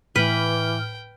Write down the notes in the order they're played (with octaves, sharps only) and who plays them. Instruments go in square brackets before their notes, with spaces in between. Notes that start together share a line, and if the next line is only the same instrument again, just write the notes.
[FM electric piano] A2 F6 [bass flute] E3 [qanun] B4 [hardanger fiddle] G5